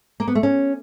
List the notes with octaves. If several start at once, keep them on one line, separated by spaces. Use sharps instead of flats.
A#3
B3
A3
C#4